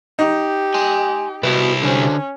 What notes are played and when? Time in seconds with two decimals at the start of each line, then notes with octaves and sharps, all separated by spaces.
0.19 D#4 G4
0.74 G#5 C6
1.43 C2 E4 F#4 B4
1.83 D3 C#4 C5